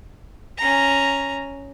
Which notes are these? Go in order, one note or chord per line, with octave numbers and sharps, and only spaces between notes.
C#4 A#5